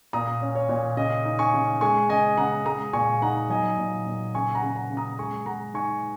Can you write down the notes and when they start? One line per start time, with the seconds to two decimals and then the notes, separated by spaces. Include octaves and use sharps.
0.13 A#2 A#5 D#6
0.41 C#4
0.55 C#5
0.69 A#2
0.97 C#3 D#5
1.25 D#4
1.39 G#5 C#6
1.54 C#3
1.81 G#3 G#5 C#6
2.09 C#3 D#5 G#5
2.37 C#3 F#5 A#5
2.66 G#3 A#5 D#6
2.93 A#2 G#5 C#6
3.22 D#4 F#5 A#5
3.49 F#3 D#5 G#5
3.78 A#2
4.06 A#2
4.35 C#3 G#5 C#6
4.55 F#5 A#5
4.62 C#3
4.76 F#5 A#5
4.90 C#3
4.97 A#5 D#6
5.19 G#3 G#5 C#6
5.46 G#3 F#5 A#5
5.74 D#4 G#5 C#6